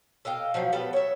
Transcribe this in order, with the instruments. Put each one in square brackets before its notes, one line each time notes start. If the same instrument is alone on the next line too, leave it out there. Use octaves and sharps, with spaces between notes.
[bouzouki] A4 D#5 F5 G5
F3 F#3 A3 C4
G3 B3 A4 B4
C#5 E5